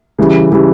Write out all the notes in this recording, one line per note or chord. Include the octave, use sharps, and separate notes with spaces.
C#3 E3 G3
C#3 E3 G3